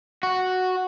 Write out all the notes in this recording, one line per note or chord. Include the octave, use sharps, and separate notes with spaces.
F#4